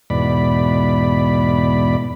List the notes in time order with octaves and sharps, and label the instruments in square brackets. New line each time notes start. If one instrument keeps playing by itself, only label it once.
[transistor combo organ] E2 G#2 B2 D5 B5